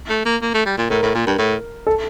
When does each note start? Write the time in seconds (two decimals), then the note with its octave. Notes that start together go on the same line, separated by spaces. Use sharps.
0.10 A3
0.25 A#3
0.42 A#3
0.54 A3
0.66 G3
0.78 A#2
0.90 A2 A#4
1.03 A2
1.15 A#2
1.27 G2
1.38 A2
1.87 A4